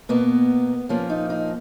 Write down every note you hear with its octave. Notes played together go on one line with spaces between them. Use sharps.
B2 A#3 B3
A#2 F3 A#3 C#4
D#4
D#4